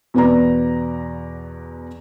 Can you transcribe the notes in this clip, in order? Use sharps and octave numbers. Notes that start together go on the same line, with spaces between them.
E2 B2 B4 D5 A#5